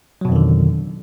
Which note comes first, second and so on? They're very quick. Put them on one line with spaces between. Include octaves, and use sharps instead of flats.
F#3 B2 F2 D#3 D3